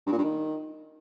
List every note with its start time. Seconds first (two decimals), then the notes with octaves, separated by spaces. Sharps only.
0.06 G2
0.12 A#2
0.18 G2
0.23 D#3